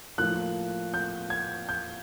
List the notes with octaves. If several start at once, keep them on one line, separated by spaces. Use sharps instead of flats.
A2 F3 A#3 F#6
G6
G#6
G6